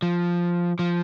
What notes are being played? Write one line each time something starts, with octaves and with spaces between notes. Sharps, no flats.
F3
F3